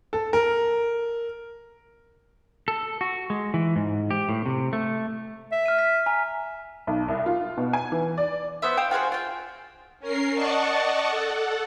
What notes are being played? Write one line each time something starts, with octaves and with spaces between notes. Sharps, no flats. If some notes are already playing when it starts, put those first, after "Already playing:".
A4
A#4
A4
F#4
G#3
E3
G#2
G4
A2
C3
A3
E5
F6 D#7
B6
G#5 A#5
B1
C2
F4
B2
G#5
E3
D5
B3 C5 E5
C5 F5 G5
F4 F#4 G#4 C5
F4 G5
C#4 A#4 C7
D5 D#5 F#5 A5 C#6
A4 F#5